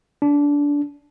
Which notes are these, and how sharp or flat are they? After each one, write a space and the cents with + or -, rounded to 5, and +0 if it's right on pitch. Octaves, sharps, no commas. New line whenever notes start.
D4 -20